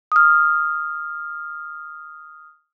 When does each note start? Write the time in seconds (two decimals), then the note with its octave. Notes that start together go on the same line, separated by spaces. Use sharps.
0.12 D#6 F6